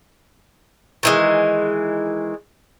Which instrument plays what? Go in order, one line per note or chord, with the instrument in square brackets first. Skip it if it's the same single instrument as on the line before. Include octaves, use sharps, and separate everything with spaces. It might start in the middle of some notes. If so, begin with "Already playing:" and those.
[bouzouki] D#3 E3 G#3